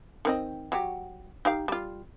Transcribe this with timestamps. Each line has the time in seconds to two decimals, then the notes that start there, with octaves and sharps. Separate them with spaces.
0.25 D#3 C4 D#5
0.72 F#3 F#4 G4
1.45 D#4 G4 F5
1.68 G3 F4